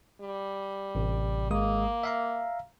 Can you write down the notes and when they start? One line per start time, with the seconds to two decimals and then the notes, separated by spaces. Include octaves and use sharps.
0.21 G3
0.95 A1 C3
1.51 G#1 G#3 A#3 D#6
2.03 E5 F5 A#5